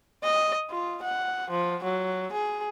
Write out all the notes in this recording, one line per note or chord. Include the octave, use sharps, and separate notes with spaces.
D#5
F4
F#5
F3
F#3
G#4